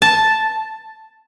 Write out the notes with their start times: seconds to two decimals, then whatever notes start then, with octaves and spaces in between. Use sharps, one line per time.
0.02 A5